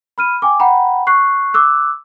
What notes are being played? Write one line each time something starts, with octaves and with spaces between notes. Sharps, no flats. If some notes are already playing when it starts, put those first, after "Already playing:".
B5 F6 D#7
G5 G#5 D6
F#5 G5 A#5 B5
C#6 F#6 C7
D6 E6 F#6